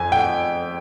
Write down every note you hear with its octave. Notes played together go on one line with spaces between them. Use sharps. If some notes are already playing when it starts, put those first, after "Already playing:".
Already playing: F2 G#5
G5